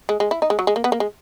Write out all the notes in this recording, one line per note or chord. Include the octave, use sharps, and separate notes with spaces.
G#3
G#3
E4
D#4
G#3
F#3
G#3
A#3
B3
A#3
G#3